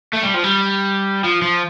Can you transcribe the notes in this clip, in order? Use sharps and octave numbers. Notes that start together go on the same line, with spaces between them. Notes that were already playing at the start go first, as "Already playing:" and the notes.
A3
G3
F3
G3
F3
F3